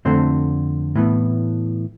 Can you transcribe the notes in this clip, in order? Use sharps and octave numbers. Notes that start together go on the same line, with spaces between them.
F2 D3 A3 C4 C5
A2 E3 B3